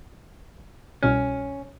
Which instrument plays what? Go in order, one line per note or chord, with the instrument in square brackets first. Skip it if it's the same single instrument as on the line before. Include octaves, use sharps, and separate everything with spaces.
[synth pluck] C2 B2 F6 [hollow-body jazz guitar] C#4